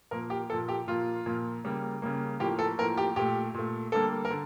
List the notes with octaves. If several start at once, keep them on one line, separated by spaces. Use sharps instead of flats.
A#2 F3 A#3 A#4
G4
A#2 F3 A#3 A4
G4
A#2 F3 A#3 F4
A#2 F3 A#3
C#3 G3 A#3
C#3 G3 A#3
A2 F3 A#3 G4
A4
A2 F3 A#3 A#4
G4
A#2 A3 G4
A#2 A3
D3 G3 A#3 A4
A#4
D3